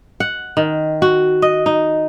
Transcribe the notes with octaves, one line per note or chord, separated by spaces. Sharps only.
F#5
D#3
F#4
D#5
D#4